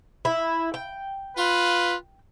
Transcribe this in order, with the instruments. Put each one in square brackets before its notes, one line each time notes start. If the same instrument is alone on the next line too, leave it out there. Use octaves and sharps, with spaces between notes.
[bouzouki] E4
G5
[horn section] F4 B4